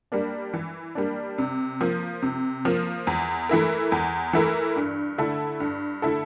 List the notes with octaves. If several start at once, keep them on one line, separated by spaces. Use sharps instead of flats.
G3 A#3 D4
E3
G3 A#3 D4
C3
F3 A#3
C3
F3 A#3
E2
E3 A3 E4 A#4
E2
E3 A3 E4 A#4
G2
D3 A3 E4 A4
G2
D3 A3 E4 A4